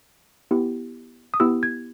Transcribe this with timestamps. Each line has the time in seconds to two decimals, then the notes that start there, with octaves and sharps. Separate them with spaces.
0.51 B3 E4 G4
1.34 D#6
1.40 B3 E4 G4 E6
1.63 G#6